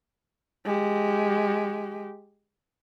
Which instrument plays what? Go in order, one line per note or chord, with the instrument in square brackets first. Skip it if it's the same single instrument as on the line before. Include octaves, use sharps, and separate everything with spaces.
[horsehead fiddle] G#3 G4